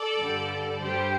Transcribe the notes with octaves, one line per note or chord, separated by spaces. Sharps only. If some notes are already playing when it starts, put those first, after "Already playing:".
Already playing: A4 D5
G2 D3 G3
G2 G3 G4 C5